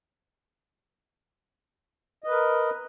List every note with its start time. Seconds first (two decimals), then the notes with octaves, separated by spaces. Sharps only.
2.24 D#5
2.28 B4
2.31 A#4